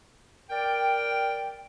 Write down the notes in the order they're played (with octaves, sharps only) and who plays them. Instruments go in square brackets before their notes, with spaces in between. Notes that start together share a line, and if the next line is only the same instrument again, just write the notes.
[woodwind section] A#4 D5 G5